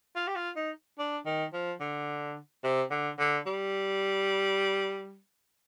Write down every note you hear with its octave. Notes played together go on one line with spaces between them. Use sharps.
F4
G4
F4
D#4
D4
D#3
F3
D3
C3
D3
D3
G3